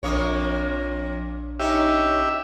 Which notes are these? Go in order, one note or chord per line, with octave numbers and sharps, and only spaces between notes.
A#1 F2 A#3 D4 C#5 D#6
C#4 D#4 G4 E5